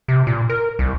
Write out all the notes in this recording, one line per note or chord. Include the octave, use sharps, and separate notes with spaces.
C3
A#2
A#4
C2